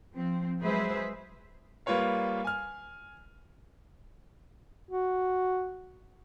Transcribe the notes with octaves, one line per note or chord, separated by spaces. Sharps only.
F3 C4
F#3 G#3 G#4 B4 C5 E5
G3 A#3 F4 B4 C#5 F5
G#5 F6
F#4